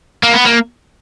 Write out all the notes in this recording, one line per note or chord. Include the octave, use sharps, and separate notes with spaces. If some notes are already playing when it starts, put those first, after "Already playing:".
A#3
B3
A#3